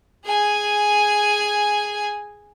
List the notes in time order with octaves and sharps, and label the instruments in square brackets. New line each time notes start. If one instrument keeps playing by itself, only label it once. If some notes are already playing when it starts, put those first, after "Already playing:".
[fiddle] G#4 G#5